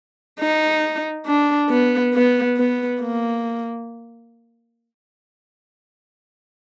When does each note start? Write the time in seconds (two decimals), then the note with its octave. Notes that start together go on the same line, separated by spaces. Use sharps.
0.40 D#4
1.26 D4
1.70 B3
2.14 B3
2.57 B3
3.01 A#3